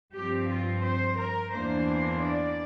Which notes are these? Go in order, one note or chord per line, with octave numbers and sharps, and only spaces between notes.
G2 F3 C4 G4
F4
C5
A#4
E2 E3 A#3 D4 C5
D5